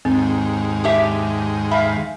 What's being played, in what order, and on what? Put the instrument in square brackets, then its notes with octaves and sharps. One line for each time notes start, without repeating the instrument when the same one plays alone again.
[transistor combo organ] D#2 G#2 [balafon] C4
[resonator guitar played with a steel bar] D4 G4 E5
[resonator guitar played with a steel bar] E5 F5 [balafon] B5